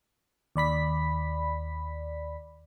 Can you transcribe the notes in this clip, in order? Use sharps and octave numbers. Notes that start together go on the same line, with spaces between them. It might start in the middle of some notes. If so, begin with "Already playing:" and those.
D#2 D5 B5 B6